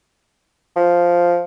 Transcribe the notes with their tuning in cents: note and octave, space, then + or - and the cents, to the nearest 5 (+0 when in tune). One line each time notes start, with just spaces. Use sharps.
F3 +0